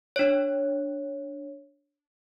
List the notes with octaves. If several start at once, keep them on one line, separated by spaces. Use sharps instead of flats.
D4 C#5